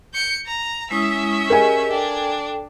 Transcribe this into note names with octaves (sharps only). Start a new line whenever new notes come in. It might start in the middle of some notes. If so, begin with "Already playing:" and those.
G6 C#7
A#5
G#3 C#4 E4 E5 D#6
G4 G#4 A#4 D#5 G#5
D4 A4 G5